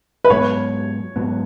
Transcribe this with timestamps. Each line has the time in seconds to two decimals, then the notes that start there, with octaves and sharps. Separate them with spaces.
0.24 B4
0.30 G#2 F#3 B3 C#5
1.16 G#2 F#3 B3